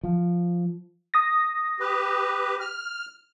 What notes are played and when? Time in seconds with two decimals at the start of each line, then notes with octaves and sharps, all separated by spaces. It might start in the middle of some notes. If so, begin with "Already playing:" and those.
0.04 F3
1.14 D#6 A#6
1.80 G4 B4
2.60 F6